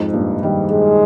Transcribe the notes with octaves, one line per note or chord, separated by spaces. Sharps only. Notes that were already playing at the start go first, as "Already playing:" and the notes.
Already playing: F2 G#2
G2 A#2
D#3 G3
G#3